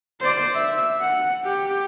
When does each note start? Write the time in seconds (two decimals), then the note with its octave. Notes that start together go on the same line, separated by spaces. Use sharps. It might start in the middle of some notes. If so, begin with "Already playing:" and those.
0.21 C5 D5
0.55 E5
1.01 F#5
1.45 G4